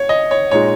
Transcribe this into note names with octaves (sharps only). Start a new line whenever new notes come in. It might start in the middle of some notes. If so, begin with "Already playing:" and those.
Already playing: C#5
D#5
C#5
A#2 G#3 D#4 C#5